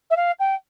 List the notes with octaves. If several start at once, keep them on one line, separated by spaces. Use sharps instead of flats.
E5
F5
G5